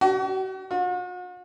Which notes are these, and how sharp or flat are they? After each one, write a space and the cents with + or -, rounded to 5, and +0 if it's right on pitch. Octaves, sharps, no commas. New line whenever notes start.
F#4 +40
F#4 -45